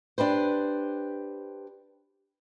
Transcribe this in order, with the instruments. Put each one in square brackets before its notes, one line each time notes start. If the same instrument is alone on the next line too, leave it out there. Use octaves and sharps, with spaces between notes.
[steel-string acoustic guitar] D4 G4 B4 C5